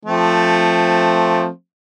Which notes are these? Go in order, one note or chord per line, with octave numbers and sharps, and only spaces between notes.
F3 A3 C4